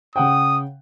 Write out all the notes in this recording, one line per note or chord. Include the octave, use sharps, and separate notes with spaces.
C#3 F#5 G5 D#6